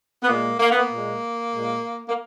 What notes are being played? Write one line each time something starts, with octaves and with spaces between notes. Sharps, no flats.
B3
A#2 G#3 A#3
A#3
B3
A#3
A#2 G#3
A#2 G#3
A#3